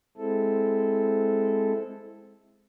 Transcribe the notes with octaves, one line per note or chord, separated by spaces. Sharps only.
G#3 C4 E4 A4